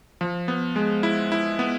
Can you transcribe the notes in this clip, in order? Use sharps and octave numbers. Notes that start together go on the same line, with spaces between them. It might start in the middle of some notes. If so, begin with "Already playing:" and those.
F3
B3
G#3
E4
E4
B3